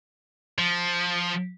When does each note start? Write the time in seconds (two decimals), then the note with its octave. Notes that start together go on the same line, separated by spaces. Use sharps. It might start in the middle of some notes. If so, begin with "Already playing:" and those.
0.58 F3